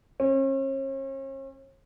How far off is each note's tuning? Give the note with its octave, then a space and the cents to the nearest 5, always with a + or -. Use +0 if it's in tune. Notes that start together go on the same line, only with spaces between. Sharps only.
C#4 -40